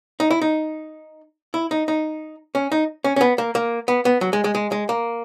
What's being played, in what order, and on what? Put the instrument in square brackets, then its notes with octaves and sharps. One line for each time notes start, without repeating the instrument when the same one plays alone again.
[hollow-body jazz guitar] D#4
E4
D#4
E4
D#4
D#4
C#4
D#4
C#4
C#4
B3
A#3
A#3
B3
B3
F#3
G#3
G#3
G#3
G#3
A#3